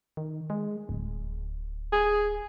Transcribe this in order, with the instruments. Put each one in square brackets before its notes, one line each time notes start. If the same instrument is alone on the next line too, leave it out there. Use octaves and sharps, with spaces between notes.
[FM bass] D#3
G#3
D1
[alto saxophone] G#4